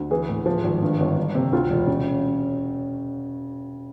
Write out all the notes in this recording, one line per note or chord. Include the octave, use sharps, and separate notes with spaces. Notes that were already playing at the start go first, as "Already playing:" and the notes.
Already playing: D2
E3 G#4
A2
F3
G#1
G2
G1
G1
C3
D2 F4
E1
C#3